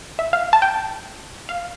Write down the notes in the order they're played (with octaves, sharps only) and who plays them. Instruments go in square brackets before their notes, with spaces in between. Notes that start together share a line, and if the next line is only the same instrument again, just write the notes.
[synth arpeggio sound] E5
F5
A5
G5
F5